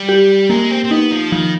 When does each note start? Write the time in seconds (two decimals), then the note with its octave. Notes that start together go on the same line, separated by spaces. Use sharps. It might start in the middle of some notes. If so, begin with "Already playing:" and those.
Already playing: G3
0.09 G4
0.50 G#3 A#3
0.70 C4
0.84 C4
0.91 B3 D#4
1.11 F3
1.32 D#3 F3